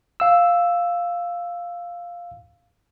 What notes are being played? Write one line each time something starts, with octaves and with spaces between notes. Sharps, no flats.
F5 E6